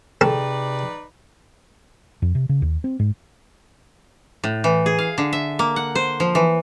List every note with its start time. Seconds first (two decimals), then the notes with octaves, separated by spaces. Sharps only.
0.21 C3 D#4 G#4 A4 B4 D5 G5
2.22 F2
2.35 C3
2.49 C#3
2.62 D#2
2.84 C4
2.99 G#2
4.44 A2
4.64 E3
4.86 G#4
4.99 F5
5.18 D3
5.33 E5
5.59 A#3
5.76 F#5
5.95 C5
6.20 F3
6.35 E3